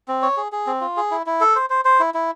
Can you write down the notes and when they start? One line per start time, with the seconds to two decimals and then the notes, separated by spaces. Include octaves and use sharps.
0.08 C4
0.22 C#5
0.37 G#4
0.52 G#4
0.67 C4
0.81 F4
0.97 G#4
1.11 E4
1.26 E4
1.41 A4
1.56 C5
1.70 C5
1.85 C5
2.00 E4
2.14 E4